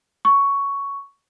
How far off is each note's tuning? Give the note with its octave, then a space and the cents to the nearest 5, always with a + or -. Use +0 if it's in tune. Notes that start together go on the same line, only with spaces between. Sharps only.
C#6 +10